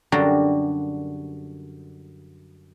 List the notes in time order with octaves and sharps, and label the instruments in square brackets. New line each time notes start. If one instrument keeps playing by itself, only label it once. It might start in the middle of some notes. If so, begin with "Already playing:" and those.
[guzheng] F#2 D3 G3 F#4 A#4 C6